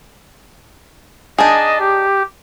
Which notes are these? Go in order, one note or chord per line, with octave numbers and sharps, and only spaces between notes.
D4 D#4 G#4 D#5 A5
G4